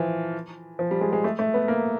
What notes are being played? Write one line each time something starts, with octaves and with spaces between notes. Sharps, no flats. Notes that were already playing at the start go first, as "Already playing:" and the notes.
Already playing: E3 F3
F3
G3
G#3
G#3
A3
A3
B3
A#3